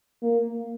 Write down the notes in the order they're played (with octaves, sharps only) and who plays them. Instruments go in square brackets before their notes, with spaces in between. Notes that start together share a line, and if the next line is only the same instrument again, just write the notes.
[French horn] A#3